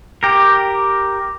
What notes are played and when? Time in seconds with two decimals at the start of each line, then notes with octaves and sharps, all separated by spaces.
0.23 G4 A#4